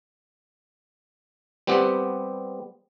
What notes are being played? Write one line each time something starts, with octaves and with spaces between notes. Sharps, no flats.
G3 B3 C4 G4 F#5